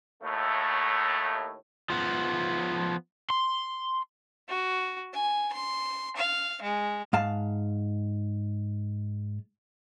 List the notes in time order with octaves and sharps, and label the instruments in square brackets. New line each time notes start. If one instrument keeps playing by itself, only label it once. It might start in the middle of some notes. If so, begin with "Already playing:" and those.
[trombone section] D#2 A2 A3
[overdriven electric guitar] F3 B3
C6
[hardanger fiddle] F#4
G#5
C6
F5
G#3
[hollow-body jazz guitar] G#2 F5 A5